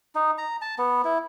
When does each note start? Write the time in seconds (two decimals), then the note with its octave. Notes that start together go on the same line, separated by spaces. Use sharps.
0.15 D#4
0.38 A#5
0.62 A5
0.78 B3
1.04 E4